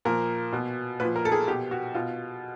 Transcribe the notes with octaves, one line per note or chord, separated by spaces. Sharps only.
A#2 F3 A#4
B2
A#2 F3 B4
A#4
A4
G#4
B2 G4
F#4
B2 F4